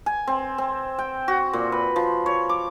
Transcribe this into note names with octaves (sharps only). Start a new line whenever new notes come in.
G#5
C4
C4
G5
F#4
A#2
B4
F3
C#5
D6